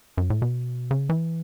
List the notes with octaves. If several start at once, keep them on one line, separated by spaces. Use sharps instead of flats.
F#2
A2
B2
C#3
E3